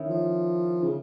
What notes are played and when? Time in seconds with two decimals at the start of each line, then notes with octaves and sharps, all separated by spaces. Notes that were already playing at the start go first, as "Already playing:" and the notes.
Already playing: D#3 C#4 E4
0.09 F3
0.83 C#3